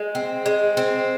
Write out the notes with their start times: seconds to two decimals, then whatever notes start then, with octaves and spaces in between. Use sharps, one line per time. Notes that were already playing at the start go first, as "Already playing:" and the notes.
Already playing: G#3
0.15 C4
0.46 G#3
0.77 C4